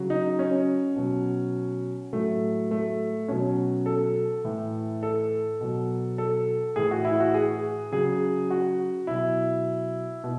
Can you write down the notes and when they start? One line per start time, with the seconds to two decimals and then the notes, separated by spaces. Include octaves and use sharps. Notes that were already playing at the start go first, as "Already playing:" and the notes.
Already playing: C#3 F#3
0.10 D#4
0.39 C#4
0.96 B2 F#3
2.13 A2 F#3 A3
2.71 A3
3.28 B2 F#3 C#4
3.86 A4
4.44 A2 E3
5.03 A4
5.61 B2 F#3
6.18 A4
6.76 A2 E3 G#4
6.91 F#4
7.05 E4
7.20 F#4
7.34 G#4
7.92 C#3 F#3 G#4
8.51 F#4
9.07 B2 F#3 E4
10.24 B2